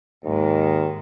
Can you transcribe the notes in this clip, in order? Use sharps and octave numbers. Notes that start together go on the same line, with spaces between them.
D#2 G#2 D#3